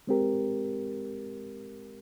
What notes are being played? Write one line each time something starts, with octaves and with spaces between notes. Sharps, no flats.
G#3 C4 G4 A#4